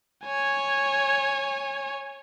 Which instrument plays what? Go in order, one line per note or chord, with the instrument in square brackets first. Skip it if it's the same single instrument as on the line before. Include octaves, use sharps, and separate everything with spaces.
[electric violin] C#5 G#5